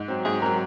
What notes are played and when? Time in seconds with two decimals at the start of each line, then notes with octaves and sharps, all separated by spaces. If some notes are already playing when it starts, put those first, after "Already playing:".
Already playing: G#2
0.08 F#3 C4
0.25 G#2 G#4
0.42 F#3 C4 A#4